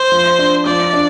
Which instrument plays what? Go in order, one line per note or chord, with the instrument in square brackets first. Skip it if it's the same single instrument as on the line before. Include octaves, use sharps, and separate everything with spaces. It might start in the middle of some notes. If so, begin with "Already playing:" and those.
Already playing: [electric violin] C5
[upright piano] F3
D4
[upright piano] F3 [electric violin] D5
[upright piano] D4